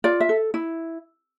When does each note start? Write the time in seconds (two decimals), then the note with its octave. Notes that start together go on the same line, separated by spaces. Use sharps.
0.04 F4 D5
0.20 E5
0.29 A4
0.54 E4